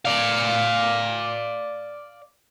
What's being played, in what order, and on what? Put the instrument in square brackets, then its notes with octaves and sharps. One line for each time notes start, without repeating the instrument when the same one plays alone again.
[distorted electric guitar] D5 F5